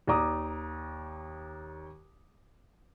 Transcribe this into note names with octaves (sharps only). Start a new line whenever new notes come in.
D#2 D5 A#5 D6 D#6